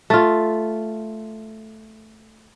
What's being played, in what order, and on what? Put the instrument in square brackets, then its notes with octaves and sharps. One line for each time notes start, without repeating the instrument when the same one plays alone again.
[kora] A3 F4